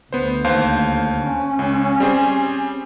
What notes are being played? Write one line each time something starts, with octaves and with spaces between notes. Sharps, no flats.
D2 B3 C5
D#2 C5 F5
C#4
C#2
G3 C4 G#4